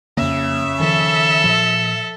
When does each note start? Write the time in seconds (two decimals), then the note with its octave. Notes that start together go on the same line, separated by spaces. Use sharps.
0.17 F2 C#3 A#3 E5
0.80 D#3 F3 C#4 A4
1.44 A#2 F3